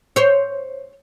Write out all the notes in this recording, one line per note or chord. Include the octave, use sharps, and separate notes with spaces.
C5 C#5